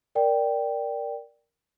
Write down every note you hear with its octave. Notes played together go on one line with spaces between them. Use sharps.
A#4 D5 G5